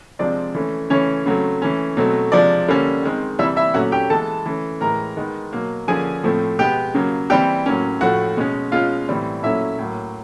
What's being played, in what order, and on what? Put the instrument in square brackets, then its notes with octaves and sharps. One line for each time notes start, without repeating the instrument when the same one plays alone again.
[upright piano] C3 F3 G#3 C4 D4 D5
E3 A3 C#4
C#3 E3 A3 C#4 C#5
C#3 F#3 A3 C4
E3 A3 C#4
B2 F#3 A3 C4
C3 F3 G#3 D4 D5
D3 G3 A#3 C#4
D#3 G#3 C4
C3 E3 G3 E4 E5
E4 E5
A#2 F#3 A3 C#4 F#4 F#5
G4 G5
E3 G#3 B3 A4 A5
E3 A3 C#4
A2 E3 G#3 A#4 A#5
D#3 G#3 B3
B2 F#3 A#3
D3 F3 A#3 C#4 G#4 G#5
A2 F3 A3 C4
B2 G#3 B3 G4 G5
C#3 F#3 A#3
E3 G3 C4 G4 G5
A2 F#3 A#3 C#4
A2 F3 A3 F#4 F#5
B2 G#3 C#4
B2 G#3 C#4 F4 F5
A2 E3 G3 C4
A#2 F#3 A3 C#4 E4 E5
A2 F#3 A#3